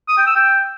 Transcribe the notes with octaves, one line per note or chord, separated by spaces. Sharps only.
D#6
G5
E6
G5